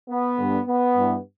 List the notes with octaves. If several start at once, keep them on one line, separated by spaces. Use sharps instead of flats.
B3
G2 D3
B3
G2 E3